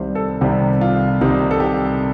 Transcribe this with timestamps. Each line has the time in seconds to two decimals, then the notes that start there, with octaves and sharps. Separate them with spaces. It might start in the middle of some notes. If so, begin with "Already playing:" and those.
Already playing: C2 C3 D#3 G3 C5
0.15 A4
0.41 C2 C3 D#3 G3 G4
0.81 F4
1.21 C2 C3 D#3 G3 D#4
1.51 A4
1.60 G4